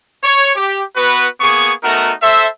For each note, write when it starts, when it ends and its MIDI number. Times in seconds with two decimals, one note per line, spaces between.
0.23 0.53 73
0.55 0.81 67
0.95 1.26 59
0.95 1.26 66
0.95 1.26 71
1.40 1.71 58
1.40 1.71 59
1.40 1.71 68
1.40 1.71 85
1.83 2.11 57
1.83 2.11 59
1.83 2.11 63
1.83 2.11 66
1.83 2.11 70
2.21 2.46 69
2.21 2.46 72
2.21 2.46 76